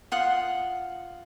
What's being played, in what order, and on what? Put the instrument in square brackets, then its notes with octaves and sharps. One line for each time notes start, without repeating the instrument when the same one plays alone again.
[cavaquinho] F4 F#5 D#6